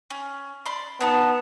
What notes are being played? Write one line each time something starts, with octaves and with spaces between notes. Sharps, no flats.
C#4
D5 B5 C6
B3 D4 D#4 A5